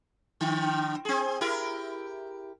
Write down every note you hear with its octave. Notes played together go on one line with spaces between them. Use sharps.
D3
C4 G#4
E4 G4 A#4